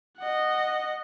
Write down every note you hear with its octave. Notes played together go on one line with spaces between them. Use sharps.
D#5 F#5